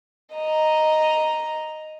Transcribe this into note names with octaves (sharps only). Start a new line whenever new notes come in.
D#5 A#5